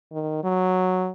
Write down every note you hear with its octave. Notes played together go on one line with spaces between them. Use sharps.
D#3
F#3